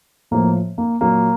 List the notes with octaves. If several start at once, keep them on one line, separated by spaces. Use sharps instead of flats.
A2 F3 A#3
A#3
A#2 F#3 A#3